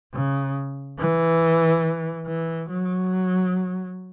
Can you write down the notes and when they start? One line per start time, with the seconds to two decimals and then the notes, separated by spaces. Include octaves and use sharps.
0.13 C#3
0.99 E3
2.27 E3
2.70 F#3